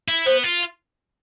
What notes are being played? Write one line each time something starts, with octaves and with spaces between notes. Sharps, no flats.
E4
B3 C5
F4